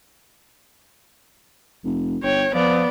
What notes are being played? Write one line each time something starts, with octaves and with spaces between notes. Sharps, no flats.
F1
G1 C#5 G5
F3 B3 D5